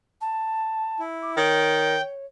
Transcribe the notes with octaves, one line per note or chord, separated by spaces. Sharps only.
A5
E4
D6
D#3 C#5 G5